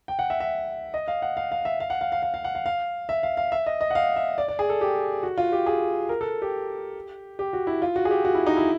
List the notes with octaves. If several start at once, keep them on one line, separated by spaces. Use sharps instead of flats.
G5
F#5
E5
E5
D#5
F5
F#5
F5
F5
E5
F5
F#5
F5
F5
F5
F5
F#5
F5
F5
E5
F5
F5
E5
D#5
D#5
F#5
F5
E5
D5
D5
G#4
A4
G4
F#4
F4
G4
G#4
A#4
A4
G4
G4
F#4
E4
F4
F#4
G#4
G4
F#4
E4
D#4
E4